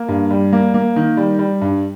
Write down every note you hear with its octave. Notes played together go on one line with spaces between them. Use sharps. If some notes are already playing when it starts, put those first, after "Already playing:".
Already playing: A#3
G2
G3
A#3
A#3
D#3
G3
G3
G2